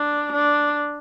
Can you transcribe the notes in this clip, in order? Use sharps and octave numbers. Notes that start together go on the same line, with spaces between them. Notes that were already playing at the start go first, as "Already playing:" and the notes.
Already playing: D4
D4